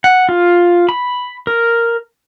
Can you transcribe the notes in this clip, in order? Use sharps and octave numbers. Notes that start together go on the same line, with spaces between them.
F#5
F4
B5
A#4